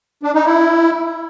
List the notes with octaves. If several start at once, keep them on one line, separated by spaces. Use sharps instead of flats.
D4
D#4
E4